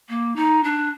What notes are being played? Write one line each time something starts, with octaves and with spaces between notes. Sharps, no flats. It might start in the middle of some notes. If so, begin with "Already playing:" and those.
A#3
D#4
D4